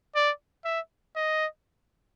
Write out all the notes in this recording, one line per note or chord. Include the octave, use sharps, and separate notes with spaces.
D5
E5
D#5